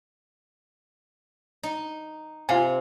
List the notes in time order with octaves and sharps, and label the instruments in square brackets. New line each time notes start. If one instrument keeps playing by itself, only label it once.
[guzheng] D#4
[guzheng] C3 [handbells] F4 F5 G#5